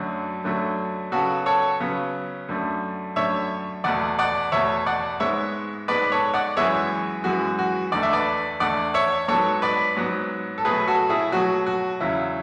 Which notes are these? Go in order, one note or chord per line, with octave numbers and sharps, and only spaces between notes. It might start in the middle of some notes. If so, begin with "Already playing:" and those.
Already playing: F#2 D3 F#3 A3
F#2 D3 F#3 A3
C#3 F#3 B3 F#4 A4
A4 C#5
C#3 F#3 B3
F#2 D3 A3
F#2 D3 A3 C#5 E5
E2 B2 A3 D5 F#5
D5 F#5
E2 B2 A3 C#5 E5
D5 F#5
G#2 G#3 B3 C#5 E5
G#2 G#3 B3 B4 D5
A4 C#5
D5 F#5
F#2 E3 G#3 B3 C#5 E5
F#2 E3 G#3 B3 F#4
F#4
E2 D3 A3 D5
E5
B4 D5
E2 D3 A3 D5 F#5
C#5 E5
G#2 F#3 B3 A4 C#5
B4 D5
G#2 F#3 B3
A4
B2 F#3 A3 G#4 B4
F#4 A4
E4 G#4
B2 F#3 A3 F#4
F#4
E2 C#3 F#3 E4